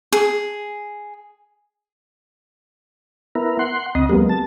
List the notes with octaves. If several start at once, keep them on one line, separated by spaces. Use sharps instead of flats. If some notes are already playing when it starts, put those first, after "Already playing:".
G#4
B3 E4 A#4
F#5 C6
D2 C#3 C4 D#5
F#3 G#3 A#3 B3 G4
A5